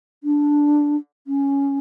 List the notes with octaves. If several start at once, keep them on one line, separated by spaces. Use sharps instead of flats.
D4
C#4